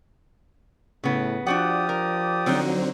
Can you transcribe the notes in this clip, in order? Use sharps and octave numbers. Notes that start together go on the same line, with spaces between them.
A2 C#3 B3
F3 D4 F#4 G4 D5 F#5 D#6
A#4
D3 F#3 C4 D#4